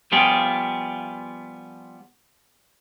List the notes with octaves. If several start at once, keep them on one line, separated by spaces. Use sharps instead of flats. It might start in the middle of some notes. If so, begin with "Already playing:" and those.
F3 G3 B3 F4 G4 G#4